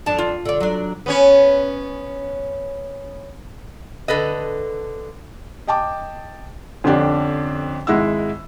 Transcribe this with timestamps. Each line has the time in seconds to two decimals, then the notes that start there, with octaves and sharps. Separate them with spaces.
0.06 F2 D4 A5
0.18 F4
0.45 D3 D5
0.60 F#3 D4
1.06 B3 C#4 C#5
4.08 D3 A4 B4 D#5
5.67 D#5 G5 A5 D6
6.84 F2 D3 C#4 D4 G4
7.87 G#1 G#3 E4 F#5 E6